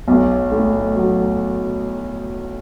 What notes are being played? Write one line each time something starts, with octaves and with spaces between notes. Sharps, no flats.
B1
A2
F#3